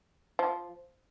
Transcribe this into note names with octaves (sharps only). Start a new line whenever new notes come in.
F3